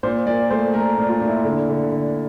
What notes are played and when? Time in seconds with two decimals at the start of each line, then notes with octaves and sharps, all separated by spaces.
0.03 A#2 C5
0.26 A#2 D5
0.50 A3 C5
0.74 A3 A#4
0.98 A#2
1.09 F4
1.21 A#2
1.27 E4
1.44 D3
1.69 D3
1.92 D3